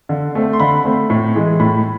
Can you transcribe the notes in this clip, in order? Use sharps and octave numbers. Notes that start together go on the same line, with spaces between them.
D3
A3 C4
C6
D3 B5
A3 C4
A2
E3 G#3
A2 B5